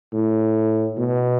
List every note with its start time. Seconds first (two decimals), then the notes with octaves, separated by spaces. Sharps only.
0.13 A2
0.98 B2